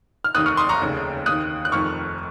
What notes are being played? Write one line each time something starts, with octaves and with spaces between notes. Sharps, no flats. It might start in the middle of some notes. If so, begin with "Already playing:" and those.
F6
F1 D#2 D#3 D#6 F#6
C#6 F6
C6 D#6
A#5 C#6
F1 D#2 C#3
D#2 D#3 D#6 F#6
F#6
F1 F2 D#3 C#6 F6